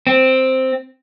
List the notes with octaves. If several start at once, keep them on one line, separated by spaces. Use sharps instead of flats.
C4